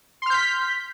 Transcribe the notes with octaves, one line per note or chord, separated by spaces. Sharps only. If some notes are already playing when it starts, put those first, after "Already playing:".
C6 F6 G6 B6